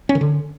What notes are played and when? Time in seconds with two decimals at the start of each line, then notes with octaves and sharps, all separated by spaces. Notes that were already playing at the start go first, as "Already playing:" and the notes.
0.09 C#4
0.15 D#3
0.21 D3